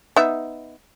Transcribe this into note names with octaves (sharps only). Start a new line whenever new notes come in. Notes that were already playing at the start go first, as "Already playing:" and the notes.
B3 D#4 E5